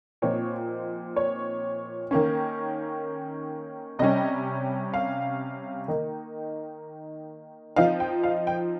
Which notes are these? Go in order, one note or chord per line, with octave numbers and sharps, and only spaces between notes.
A#2 F3 C4 D#4 C#5
C#5
D#3 A#3 C#4
C3 G3 C#4 D#5
F5
D#3 A#3 D#4
F3 C4 D#4 F5
G5
F5
G5